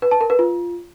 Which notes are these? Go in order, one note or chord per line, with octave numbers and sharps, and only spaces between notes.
B4
A5
A#4
B4
F4